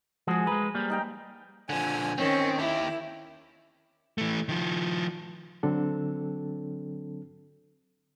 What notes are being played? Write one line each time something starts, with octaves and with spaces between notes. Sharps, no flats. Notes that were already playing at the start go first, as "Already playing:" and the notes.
F3 G#3 F#4 G#4 C5
G#3 B4 A#5
G3 A#3
D#4 G5 A#5
D3 F3 G#5
D#3 C4 C#4
D#3 E4 G4
E3 A3
D#3 F3
D3 F#3 C4 D4 A4